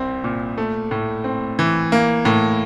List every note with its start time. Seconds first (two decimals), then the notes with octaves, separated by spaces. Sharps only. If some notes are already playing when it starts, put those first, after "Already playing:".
Already playing: C2 C4
0.24 A#2
0.58 A3
0.91 A2
1.24 C4
1.59 E3
1.92 A#3
2.25 A2